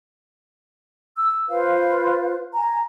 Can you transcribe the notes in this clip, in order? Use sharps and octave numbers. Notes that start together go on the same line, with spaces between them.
E6
F4 B4 C5 F5
G#5 A#5